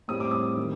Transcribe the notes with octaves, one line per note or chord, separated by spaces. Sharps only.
A2 G3 C4 D#6
D6
D#6
D#3